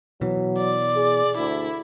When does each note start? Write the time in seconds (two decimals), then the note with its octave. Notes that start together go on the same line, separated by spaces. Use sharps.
0.21 B2 E3 F#3
0.58 D5
0.96 G#4
1.38 D2 E4